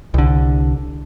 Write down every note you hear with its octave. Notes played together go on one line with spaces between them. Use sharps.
C2 D3